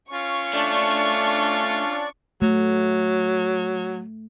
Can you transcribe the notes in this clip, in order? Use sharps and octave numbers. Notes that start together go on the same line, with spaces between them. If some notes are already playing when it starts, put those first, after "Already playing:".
C#4 F4 C#6
A3 D4 D5
F#3 A3